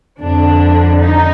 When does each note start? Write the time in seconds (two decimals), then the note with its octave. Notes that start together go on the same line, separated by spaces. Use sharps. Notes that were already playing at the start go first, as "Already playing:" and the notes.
0.20 F2 D3 D4
1.00 D#4